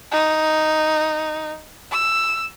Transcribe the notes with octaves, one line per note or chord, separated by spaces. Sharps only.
D#4
E6